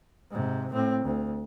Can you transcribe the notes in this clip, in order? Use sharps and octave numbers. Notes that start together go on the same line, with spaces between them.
G#2 C3
A2 C4
D2